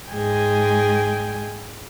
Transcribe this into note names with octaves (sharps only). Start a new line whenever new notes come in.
G#2 G#3 G#4 G5 G#5